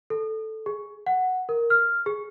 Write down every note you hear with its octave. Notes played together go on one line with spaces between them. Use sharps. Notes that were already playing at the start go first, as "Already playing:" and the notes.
A4
G#4
F#5
A#4
F6
G#4